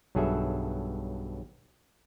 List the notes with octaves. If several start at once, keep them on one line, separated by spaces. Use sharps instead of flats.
B1 G2 F#3 G#4 A4 E5